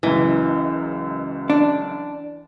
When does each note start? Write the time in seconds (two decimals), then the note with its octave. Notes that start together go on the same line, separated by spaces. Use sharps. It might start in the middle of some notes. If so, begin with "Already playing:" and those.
0.03 F#1 C#2 F#2 E3
1.50 D4